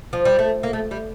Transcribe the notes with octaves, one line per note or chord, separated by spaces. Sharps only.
F3
G3
A3
A#3
A3
G3